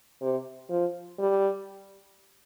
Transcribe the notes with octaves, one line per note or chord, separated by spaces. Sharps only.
C3
F3
G3